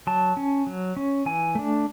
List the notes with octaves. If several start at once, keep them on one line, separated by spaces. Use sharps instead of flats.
F#3 A5
C#4
F#3
C#4
E3 G#5
A3 D4